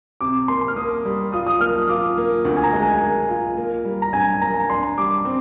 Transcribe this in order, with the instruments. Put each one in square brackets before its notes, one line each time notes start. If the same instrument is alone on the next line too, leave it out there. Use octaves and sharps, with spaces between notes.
[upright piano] C3 [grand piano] D6
[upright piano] A#3 [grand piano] C6
[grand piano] F6
[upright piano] A#3 [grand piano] D#6
[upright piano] G3
[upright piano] F4 [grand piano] D#6
[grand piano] D#6
[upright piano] A#3 [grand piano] F6
[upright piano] F4 [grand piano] D6
[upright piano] A#3
D2
[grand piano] G#5
A#5
[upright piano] G#3
[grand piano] G#5
[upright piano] A#4
F4
A#3
G3
[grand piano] A#5
[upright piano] G2 [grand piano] G#5
[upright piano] A#3 [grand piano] A#5
[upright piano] D4 [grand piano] C6
[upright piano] G3 [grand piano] D6
[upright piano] C4